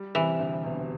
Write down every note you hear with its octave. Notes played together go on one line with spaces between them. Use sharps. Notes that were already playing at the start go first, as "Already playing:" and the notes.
Already playing: G3
C3 E3
D2
E1